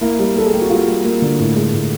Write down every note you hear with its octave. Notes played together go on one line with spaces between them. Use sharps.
A#3 E4
G3
G3 A4
G#4
A#3 G4
F#4
G3 F4
G3
A#3
D3
A2
G#3
A2